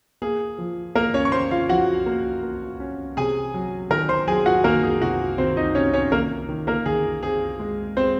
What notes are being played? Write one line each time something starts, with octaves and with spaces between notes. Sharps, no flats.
A#3 G#4
F3
A#3 A#4
C#4 C#5
C#6
C#4 C5 C6
F4 F5
F3 F#4 F#5
A#3
A#3
C#4
C3 G#4 G#5
F#3
D#3 A#4 A#5
C5 C6
F#3 G#4 G#5
F#4 F#5
D#3 A#3 A#4
G#4
C3 F#4
D#3 C4 C5
D#4 D#5
C3 C#4 C#5
C#4 C#5
D#3 A#3 A#4
D#3
A#3 A#4
D#3 G#4
C4 G#4
G#3
G#3 C4 C5